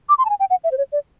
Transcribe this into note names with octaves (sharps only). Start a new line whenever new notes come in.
D6
C6
A5
G#5
G5
F#5
E5
C5
C#5
D5